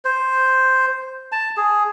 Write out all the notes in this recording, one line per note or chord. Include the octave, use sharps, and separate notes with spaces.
C5
A5
G#4